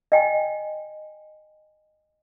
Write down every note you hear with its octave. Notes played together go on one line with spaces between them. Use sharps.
D#5 G5 G#5